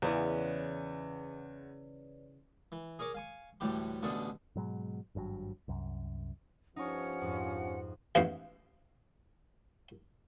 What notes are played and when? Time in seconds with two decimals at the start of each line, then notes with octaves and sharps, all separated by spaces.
0.02 E2 C#3 E3 B3 B4 C#5 D5
2.72 E3
2.99 G#4 A#4 C#5 D6
3.14 F5 G#5 C#6
3.60 D2 A2 E3 G3 G4 B5
4.02 A1 B2 D3 A3 D4 G#4
4.56 G#2 B2 F#3 G#3
5.15 G#1 G2 B2 F#3
5.68 C2 F#2
6.76 G2 F3 C#4 D#4 F#5 C#6
7.21 F2 G#2
8.15 A1 E2 G#2 F5